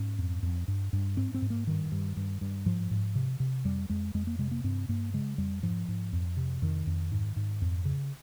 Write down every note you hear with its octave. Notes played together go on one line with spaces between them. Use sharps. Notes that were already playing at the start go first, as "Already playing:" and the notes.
Already playing: G#2 C#4
F2
F2
G2
G2
G#2 C4
C4
G#2
A#3
G2 D#3
G2
G2
G2
G#2 F3
G#2
C3
C3
F2 G3
F2 G#3
F2 G#3
A#3
C3 G#3
A#3
G2 C4
G2 A#3
C#3 G#3
F2 G3
G#2 F3
G#2
F2
C3
F2 D#3
F2
G#2
G#2
F2
C#3